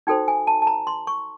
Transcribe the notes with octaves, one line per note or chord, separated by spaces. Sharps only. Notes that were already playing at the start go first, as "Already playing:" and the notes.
D#4 F#4 A4 C5 G5
G#5
A5
A5
A#5
C6
C#6